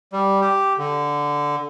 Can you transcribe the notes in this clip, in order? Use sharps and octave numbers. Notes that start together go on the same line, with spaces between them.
G3
G4
D3